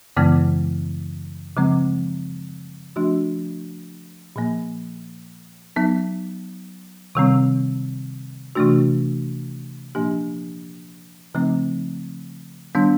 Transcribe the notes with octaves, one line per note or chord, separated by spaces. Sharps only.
F#2 C#3 E3 G#3 B3
C#3 F3 G#3 C4
F3 A3 D4 F#4
A#2 F3 A#3
F#3 B3 D#4
C3 D#3 G3 C4
C3 E3 A3 D4 F#4
A#2 F3 A#3 D4 G4
C#3 F3 A3 C4 D#4
D#3 G3 B3 D4